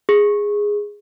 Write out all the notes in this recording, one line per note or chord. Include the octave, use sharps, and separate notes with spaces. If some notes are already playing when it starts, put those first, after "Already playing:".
G#4